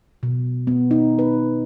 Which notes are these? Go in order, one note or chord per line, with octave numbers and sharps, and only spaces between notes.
B2
B3
D#4
B4